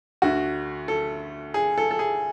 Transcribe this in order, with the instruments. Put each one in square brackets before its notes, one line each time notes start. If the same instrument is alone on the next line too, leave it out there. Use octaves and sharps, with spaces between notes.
[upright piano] D2 D3 F#4
A4
G#4
A4
A4
G#4